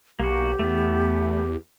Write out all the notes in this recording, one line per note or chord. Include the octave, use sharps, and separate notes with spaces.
B1 A#3 F#4 G4
E2 A3 B3